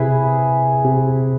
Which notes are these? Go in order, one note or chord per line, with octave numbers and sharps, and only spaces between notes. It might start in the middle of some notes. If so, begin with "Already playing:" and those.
Already playing: C3 E4 G#4 B4 E5
C3